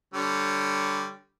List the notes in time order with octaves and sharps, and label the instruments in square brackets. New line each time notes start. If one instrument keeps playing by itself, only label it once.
[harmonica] D3 G3 C#5